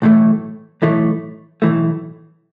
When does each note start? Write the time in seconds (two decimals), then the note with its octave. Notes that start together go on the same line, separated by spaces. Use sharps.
0.02 B1 A2 E3 A3
0.82 B1 A2 E3 A3
1.62 B1 A2 E3 A3